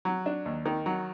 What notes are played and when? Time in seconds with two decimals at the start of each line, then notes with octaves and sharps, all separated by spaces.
0.05 F#3
0.26 D4
0.46 D#2
0.66 D#3
0.86 F#3